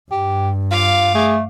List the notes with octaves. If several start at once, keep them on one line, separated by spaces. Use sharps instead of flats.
G2 G4
F4 F5 D6
A3 G#4